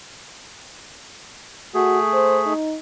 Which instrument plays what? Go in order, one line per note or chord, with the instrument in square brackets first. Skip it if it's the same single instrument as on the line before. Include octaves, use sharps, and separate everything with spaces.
[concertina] A3 G#4 [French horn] F#4
[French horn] C5
D#4